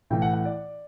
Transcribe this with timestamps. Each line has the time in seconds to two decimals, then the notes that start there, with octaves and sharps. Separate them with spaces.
0.10 A2 E3 G5
0.22 F#5
0.34 F#5
0.45 D5